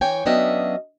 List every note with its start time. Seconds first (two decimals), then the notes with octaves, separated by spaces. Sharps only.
0.01 E3 C#5 G5 G#5
0.25 F#3 B3 C#4 D4 D#5 E5